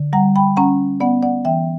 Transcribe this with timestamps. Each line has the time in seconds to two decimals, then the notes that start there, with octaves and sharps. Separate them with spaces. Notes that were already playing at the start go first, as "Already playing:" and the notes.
Already playing: D3
0.13 G3 F#5 A#5
0.36 G5 B5
0.56 C#4 F#5 A#5
1.00 B3 D5 F#5
1.23 D5 F#5
1.45 E3 E5 G5